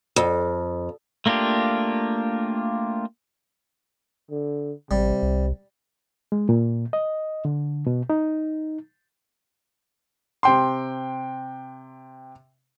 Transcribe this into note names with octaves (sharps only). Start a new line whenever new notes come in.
F2
A3 A#3 D4 F4 G4
D3
A1 C3 G3
C2
G#3
A#2
D#5
D3
B2
D#4
C3 G5 C6